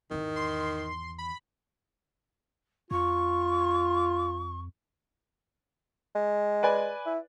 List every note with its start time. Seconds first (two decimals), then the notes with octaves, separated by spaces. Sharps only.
0.11 G#1 E2 D#3
0.36 C6
1.18 B5
2.91 F2 F4 C#6
6.15 G#3
6.63 B4 D5 G#5
7.06 E4